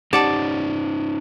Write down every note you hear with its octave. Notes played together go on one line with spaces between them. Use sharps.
C#4 D#4 G4 C5 D5 F#5 A5